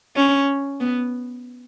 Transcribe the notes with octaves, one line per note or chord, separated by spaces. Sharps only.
C#4
B3